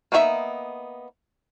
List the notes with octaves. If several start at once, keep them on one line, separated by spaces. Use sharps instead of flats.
A#3 B3 D#4 G#4 E5